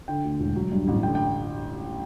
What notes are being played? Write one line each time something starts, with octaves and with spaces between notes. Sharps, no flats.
D3 G5
D2
E1
F#3
G2
A1
D3 G5
G5